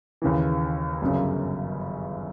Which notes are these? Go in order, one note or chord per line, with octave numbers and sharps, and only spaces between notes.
D#2 C#3 E3
G1 F#2 C#3